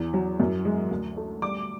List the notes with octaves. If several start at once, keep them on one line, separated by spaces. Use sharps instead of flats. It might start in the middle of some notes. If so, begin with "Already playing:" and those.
Already playing: E2
F#3
F#2
G#3
D2
A3
G3 D6